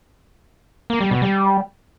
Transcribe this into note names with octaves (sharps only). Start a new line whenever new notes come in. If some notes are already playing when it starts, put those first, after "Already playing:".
A#3
G3
B2
G3